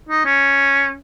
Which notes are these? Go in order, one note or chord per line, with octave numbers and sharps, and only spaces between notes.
D#4
C#4